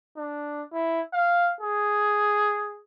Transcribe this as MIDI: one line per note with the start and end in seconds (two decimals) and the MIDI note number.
0.17 0.63 62
0.73 1.01 64
1.14 1.52 77
1.61 2.81 68